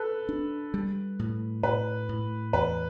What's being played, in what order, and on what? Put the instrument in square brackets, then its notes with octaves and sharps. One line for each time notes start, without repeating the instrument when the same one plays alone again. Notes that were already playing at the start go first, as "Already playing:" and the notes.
Already playing: [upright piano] A4 B4
[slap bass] D4
G3
A2
[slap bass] A2 [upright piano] B4
[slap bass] A2
[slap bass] E2 [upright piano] B4